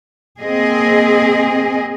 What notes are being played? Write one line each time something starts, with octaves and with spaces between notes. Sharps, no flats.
A#3 C4 G#4 D#5